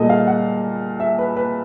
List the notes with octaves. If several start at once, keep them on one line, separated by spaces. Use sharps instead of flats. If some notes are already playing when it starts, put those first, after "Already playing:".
Already playing: A#2 G3 A#3 G#4 A4 D#5
F5
F#5
E5
B4
B4